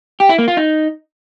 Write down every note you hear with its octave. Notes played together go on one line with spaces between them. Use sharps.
G4
E4
A#3
F4
D#4